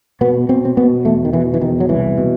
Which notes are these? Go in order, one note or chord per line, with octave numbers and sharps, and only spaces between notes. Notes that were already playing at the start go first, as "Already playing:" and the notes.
B2 B3
B2 C4
C4
B2 B3
E2 A3
D#3
B2 E3
E3
E2 D#3
F#3
C2 E3
B2